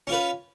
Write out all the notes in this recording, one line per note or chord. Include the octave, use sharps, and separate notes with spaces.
C#4 F4 B4